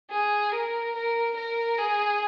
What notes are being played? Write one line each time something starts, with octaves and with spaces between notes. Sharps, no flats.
G#4
A#4
A#4
A#4
G#4